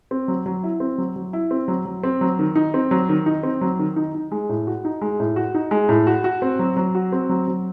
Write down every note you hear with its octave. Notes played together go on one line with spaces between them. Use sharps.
C4
F#3
F#3
E4
C4
F#3
F#3
E4
C4
F#3
F#3
C4
F#3
D#3
D#4
C4
F#3
D#3
D#4
C4
F#3
D#3
D#4
D#4
G#3
A2
F#4
D#4
G#3
A2
F#4
D#4
G#3
A2
F#4
F#4
C4
F#3
F#3
F#4
C4
F#3
F#3